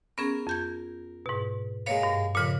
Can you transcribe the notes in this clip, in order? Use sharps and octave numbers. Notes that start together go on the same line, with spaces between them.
B3 C#4 G#4 A#4
F2 G6 G#6
G#2 B2
G#3 A#3 B4 C#5 F5
G2
F2 A#2 C#3 B5